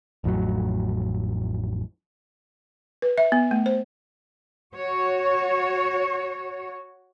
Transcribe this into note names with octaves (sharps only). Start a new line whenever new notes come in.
A1 F2 A2 F#3
B4
E5
B3
A3
C5
F#4 C#5